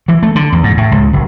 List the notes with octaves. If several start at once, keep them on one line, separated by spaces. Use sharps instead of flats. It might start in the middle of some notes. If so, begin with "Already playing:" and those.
E3
A3
D3
E2
G#2
A2
C#2
F#1